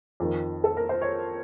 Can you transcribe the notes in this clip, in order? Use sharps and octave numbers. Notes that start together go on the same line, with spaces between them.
F2 D#3
A4
A#4
C5
C#5